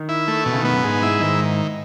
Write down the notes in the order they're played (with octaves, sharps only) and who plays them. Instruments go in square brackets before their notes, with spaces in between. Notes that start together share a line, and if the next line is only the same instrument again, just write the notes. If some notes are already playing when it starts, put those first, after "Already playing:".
Already playing: [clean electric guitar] D#3
[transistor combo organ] E4
A3
[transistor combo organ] B2 [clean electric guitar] E3
[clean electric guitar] C#3
D#3
[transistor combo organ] B3
[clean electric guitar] F#2
[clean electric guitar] G#2 [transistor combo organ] G#3
[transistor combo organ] E4
[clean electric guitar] G#2 [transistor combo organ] D#3